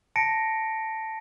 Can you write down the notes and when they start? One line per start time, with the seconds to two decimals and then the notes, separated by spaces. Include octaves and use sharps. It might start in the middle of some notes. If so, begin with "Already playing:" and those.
0.16 A5 A#6 C#7 D7